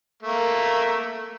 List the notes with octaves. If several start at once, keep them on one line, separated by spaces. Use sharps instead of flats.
A3 A#3